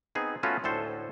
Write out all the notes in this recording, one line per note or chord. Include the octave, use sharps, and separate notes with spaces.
B3 C4 D#4 G#4
A3 B3 C#4 F4 F#4 B4
D2 A2 A4 C5